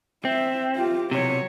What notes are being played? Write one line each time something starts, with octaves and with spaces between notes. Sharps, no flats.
C4 E5
F4 G4
B1 C3 F#3 C#5